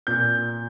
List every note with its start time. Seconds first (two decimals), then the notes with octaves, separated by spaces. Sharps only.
0.07 A#2 G6